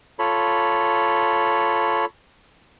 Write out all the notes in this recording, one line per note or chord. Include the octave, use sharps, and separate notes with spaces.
F4 A4 C#5 B5